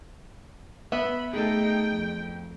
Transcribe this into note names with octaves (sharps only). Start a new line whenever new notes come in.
B3 E5 B5
A3 D#4 G#4 A4 G5
F2